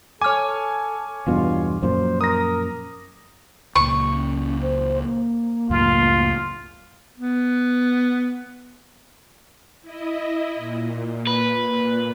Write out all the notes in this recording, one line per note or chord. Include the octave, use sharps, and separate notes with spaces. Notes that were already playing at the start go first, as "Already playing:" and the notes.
A4 C#5 G#5 D6 F6
E2 G2 B2 F4
F#2 A#2 F3 C5
A#4 D#6 A#6
C#2 A#2 C#6
C#4
C5
A#3
C#2 F#2 A2 F4
B3
E4 D#5
A#2
B4